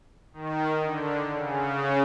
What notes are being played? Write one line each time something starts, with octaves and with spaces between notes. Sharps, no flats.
D#3
D3
C#3